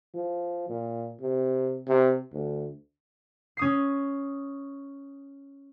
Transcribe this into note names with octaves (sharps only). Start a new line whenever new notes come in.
F3
A#2
C3
C3
D2
C#4 D#6 C7